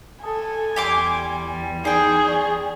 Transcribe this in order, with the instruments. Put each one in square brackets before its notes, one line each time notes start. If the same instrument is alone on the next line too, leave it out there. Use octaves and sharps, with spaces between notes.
[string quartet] A4 [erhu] G#5 [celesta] A5 D#6
[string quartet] E2 G3 [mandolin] G4 C6 D6
[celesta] D#4 D5 [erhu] G#4 [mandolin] C5 G5
[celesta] D5 C#6 D#6